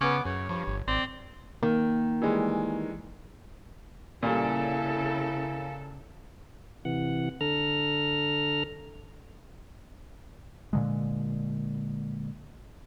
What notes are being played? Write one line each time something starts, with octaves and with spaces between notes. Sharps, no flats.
C#3 B3 C#4 D6
F#2 C#3 C#5
G2 F3
G1
G#1 C4 D5
D#3 A#3
E3 G3 G#3
A#2 C#3 G3 E4 A4 A#4 F5 G#5
C3 E3 F#5
D3 A4 A#5 F6
A#2 D3 G#3